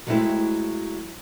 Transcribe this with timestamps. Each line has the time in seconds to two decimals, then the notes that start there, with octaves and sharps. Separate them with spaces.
0.07 F#3 G#3 A3 C4 E4